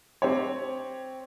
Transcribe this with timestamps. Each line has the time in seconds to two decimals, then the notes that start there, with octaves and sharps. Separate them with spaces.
0.22 C4 G4 C#5